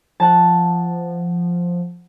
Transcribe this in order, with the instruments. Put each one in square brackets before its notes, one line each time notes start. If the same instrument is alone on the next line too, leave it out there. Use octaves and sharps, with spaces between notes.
[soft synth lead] F3 [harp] F#5 A5